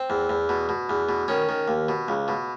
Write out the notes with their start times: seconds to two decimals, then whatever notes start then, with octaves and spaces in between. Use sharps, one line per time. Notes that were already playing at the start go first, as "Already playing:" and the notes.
Already playing: C4
0.10 E2
0.29 E2
0.49 B2
0.69 B2
0.90 E2
1.09 B2
1.28 D#3 C#4
1.49 D#3
1.68 D#2
1.89 B2
2.08 C#2
2.28 B2